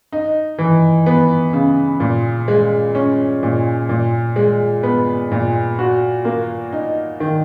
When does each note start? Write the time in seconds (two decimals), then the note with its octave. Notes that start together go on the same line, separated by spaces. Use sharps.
0.12 D#4
0.58 E3
1.06 B3
1.53 C#3
2.00 A#2
2.48 G#3
2.95 C#4
3.43 A#2
3.89 A#2
4.36 G#3
4.83 B3
5.32 A#2
5.79 F#4
6.25 A#3
6.72 D#4
7.20 D#3